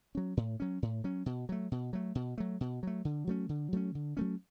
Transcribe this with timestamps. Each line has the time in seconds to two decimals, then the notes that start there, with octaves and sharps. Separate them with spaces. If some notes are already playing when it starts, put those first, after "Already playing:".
0.15 F#3 C#4
0.37 A2
0.60 F#3 C#4
0.82 A2
1.04 F#3 C#4
1.26 B2
1.49 F#3 A3
1.72 B2
1.93 F#3 A3
2.15 B2
2.38 F#3 A3
2.61 B2
2.83 F#3 A3
3.05 D3
3.27 F#3 A3 C#4
3.49 D3
3.72 F#3 A3 C#4
3.95 D3
4.17 F#3 A3 C#4